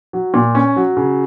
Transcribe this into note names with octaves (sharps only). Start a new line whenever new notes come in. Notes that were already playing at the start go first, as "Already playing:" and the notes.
F#3
A#2
C#4
F#3
C#3